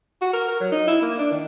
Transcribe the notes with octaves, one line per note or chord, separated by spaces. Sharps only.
F#4
A#4
A#4
F#3
D#4
E4
A#3
D4
D#3